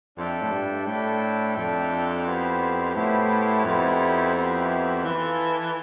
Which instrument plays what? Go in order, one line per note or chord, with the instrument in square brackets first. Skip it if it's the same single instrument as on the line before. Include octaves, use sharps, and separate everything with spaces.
[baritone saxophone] F2 [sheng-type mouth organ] D4 A4 E5 G5
[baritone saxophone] A2
G2
[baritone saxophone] A2 [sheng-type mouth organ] D4 A4 E5 G5
[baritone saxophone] F2 [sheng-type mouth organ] D4 A4 E5 G5
[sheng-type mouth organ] B3 E4 G4 C5 E5
[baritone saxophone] A2 [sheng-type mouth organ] B3 E4 G4 C5 E5
[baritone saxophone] F2 [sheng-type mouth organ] B3 E4 G4 C5 E5
[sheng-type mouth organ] B3 E4 G4 C5 E5
[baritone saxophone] E3 [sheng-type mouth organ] F4 A4 E5 A5